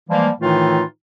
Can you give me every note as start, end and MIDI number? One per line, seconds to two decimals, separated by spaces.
0.09 0.29 52
0.09 0.29 53
0.09 0.29 55
0.09 0.29 56
0.09 0.29 58
0.41 0.82 45
0.41 0.82 51
0.41 0.82 52
0.41 0.82 57
0.41 0.82 63
0.41 0.82 65